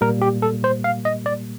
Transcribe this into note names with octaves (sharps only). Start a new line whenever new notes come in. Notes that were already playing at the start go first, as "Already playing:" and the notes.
A#2 G3 A#3 A#4
G4
A4
C5
F5
D#5
D5